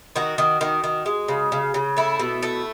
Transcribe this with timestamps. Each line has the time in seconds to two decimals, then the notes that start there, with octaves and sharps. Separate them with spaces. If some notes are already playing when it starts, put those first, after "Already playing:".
0.16 D#3 F#4
0.38 D#3
0.61 D#3
0.84 D#3
1.06 G#3
1.28 C#3
1.52 C#3
1.74 C#3
1.97 A3 E4
2.19 B2
2.43 A3